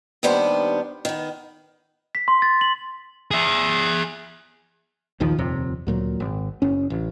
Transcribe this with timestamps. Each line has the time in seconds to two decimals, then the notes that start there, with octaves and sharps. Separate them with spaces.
0.23 D#2 D#3 G3 B3 D4 C5
1.05 D#3 B3
2.15 B6
2.28 C6
2.42 A6
2.61 F#7
3.31 G#4 E5
5.20 A#1 D#2 D#3 F3
5.38 D#1 F2 C3
5.87 D2 A#2 F#3
6.20 G#1
6.62 F#1 C#4
6.90 A1